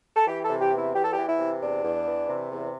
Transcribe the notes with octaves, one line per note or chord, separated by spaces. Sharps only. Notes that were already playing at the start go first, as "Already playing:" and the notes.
A4
E3 G4
C3 A4
G4
E2 E4
E2 G4
A4
E3 G4
E4
C3
E2 D4
E2
E3
C3
E2